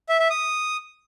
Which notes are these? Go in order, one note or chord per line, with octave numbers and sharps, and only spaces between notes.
E5
E5
D#6